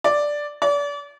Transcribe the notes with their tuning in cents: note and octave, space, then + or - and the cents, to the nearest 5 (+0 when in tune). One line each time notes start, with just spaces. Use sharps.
D5 +0
D5 -35